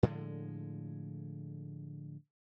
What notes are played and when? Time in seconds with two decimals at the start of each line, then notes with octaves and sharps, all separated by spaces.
0.03 A2 D3 F3 G#3